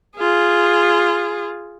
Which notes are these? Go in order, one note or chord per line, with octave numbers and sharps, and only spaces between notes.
F4 G#4